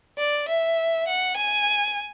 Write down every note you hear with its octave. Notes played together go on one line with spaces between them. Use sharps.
D5
E5
F#5
G#5